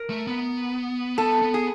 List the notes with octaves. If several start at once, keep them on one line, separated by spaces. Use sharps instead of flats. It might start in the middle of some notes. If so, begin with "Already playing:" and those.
Already playing: A#4
A3
B3
B3 A4
B3
G#4